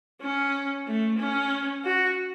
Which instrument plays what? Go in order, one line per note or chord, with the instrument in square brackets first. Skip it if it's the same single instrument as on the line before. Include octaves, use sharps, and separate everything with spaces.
[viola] C#4
A3
C#4
F#4